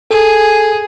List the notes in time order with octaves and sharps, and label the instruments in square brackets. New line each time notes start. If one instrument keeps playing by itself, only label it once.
[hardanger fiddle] G#4 [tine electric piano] A4